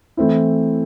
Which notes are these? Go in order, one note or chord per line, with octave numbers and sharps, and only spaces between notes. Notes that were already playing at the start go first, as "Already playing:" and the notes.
E3 A3 C4 E4